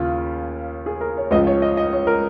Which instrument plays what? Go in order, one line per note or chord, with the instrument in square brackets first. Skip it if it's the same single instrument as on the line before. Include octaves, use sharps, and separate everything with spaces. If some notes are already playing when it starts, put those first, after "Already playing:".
Already playing: [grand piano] D#2 C#3 F4
G#4
A#4
C#5
C#2 C#3 F3 D#5
C#5
D#5
D#5
C#5
A#4